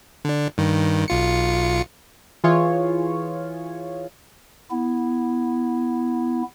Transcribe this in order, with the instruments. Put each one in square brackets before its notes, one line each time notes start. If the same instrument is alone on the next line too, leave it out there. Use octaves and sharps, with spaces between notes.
[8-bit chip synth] D3 D4
G2 D#3
B1 F4 C#7
[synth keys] E3 F4 G#4 C#5
[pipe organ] B3 E4